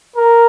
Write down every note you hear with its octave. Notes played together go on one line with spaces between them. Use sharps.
A#4